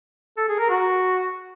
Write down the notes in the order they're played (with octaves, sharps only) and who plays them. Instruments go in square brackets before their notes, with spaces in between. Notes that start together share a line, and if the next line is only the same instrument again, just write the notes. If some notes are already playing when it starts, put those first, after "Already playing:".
[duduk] A4
G#4
A#4
F#4